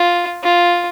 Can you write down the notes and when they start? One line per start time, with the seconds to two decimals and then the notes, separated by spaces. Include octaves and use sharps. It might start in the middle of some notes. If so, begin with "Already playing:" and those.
Already playing: F4
0.43 F4